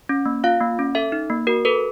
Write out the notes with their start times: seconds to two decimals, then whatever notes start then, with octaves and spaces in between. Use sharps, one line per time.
0.09 C#4
0.26 A#3
0.44 F4 F5
0.60 A#3
0.79 C#4
0.95 A4 E5
1.12 D#4
1.30 A#3
1.47 F#4 A#4
1.65 A4 B4